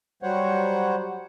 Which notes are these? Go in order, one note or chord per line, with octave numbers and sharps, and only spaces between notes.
F#3 G3 C5 C#5 F#5